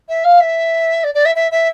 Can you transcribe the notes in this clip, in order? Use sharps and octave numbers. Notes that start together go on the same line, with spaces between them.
E5
F5
E5
D5
D5
E5
E5
E5